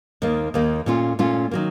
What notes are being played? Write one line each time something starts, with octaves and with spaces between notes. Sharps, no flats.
D#2 D#3 A#3
D#2 D#3 A#3
A#2 A3 C#4 F4
A#2 A3 C#4 F4
D#3 F#3 A#3